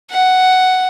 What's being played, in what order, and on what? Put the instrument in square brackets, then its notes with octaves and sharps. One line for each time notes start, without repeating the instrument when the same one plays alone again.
[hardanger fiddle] F#5